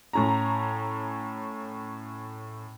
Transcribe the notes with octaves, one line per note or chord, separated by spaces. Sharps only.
A2 C#4 A#5